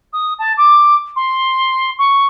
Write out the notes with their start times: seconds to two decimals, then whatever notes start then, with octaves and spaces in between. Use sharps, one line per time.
0.13 D#6
0.39 A5
0.57 D6
1.16 C6
1.98 C#6